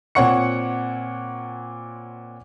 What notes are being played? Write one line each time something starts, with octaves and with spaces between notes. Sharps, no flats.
A#2 C4 C#5 F#5 C#6 C#7